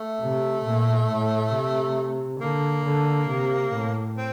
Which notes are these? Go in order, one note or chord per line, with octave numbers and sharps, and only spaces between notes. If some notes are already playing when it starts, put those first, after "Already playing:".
Already playing: A3
C3
A#2
A2
C3
D3 A#3
D3
C3
A2
C4